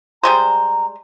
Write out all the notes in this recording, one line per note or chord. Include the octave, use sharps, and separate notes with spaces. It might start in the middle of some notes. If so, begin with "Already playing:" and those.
G3 G#3 C5 A#5